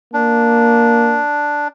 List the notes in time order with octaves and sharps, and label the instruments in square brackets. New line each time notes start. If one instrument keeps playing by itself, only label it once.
[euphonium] A#3 [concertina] D4